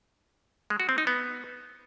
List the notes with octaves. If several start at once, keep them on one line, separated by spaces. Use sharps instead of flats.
G#3
F#4
C4
D#4
B3